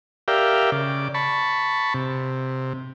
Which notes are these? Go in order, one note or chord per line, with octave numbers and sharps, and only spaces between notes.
G4 A#4 D5 E5 F5 G5
C#3 D5
A5 B5 C#6
C3